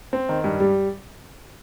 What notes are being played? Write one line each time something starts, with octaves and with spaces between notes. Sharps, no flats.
C4
D#3
G2
G3